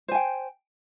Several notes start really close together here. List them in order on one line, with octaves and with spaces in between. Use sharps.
C5 G#5 G5